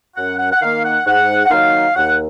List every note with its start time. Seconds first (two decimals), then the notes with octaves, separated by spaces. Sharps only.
0.16 F#2 F#5
0.39 F#5
0.51 F#5
0.61 D#3 A#3 F5
0.84 F#5
1.05 G#2 F#5
1.45 F#5
1.51 D#3 F#3 A#3 D#4 F5
1.95 D#2 F#5